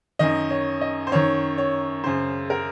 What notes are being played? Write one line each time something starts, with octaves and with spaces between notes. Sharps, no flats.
F#2 D#3 D#5
C#5
D#5
C5
F#2 D#3 C#5
C#5
F#2 C#3 C5
A#4